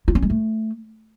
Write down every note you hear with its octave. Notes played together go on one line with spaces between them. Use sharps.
F4
C#4
G#3
A3